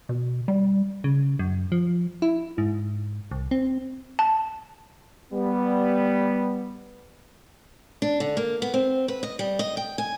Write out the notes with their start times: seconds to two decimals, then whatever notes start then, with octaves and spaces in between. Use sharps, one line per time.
0.09 B2
0.48 G3
1.04 C#3
1.39 F#2
1.72 F3
2.22 E4
2.58 G#2
3.31 C2
3.51 C4
4.19 A5
5.32 G3 B3
8.02 D4
8.20 D3
8.37 A#3
8.62 B3
8.74 C4
9.08 B4
9.23 D#5
9.39 G3
9.59 D#5
9.77 G5
9.98 G#5